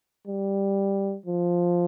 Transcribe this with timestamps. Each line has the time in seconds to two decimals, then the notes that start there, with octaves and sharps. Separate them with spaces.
0.28 G3
1.26 F3